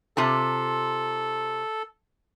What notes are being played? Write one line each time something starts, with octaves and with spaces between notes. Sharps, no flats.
C3 F4 A4 A5